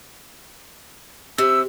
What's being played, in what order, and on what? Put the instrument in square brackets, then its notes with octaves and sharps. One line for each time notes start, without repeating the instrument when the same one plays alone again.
[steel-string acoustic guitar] C3 [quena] E6